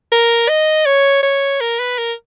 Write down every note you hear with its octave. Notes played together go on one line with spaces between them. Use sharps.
A#4
D#5
C#5
C#5
A#4
B4
A#4